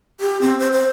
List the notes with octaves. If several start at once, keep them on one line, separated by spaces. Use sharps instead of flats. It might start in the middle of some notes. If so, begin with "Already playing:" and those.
G4
C4
C5
C5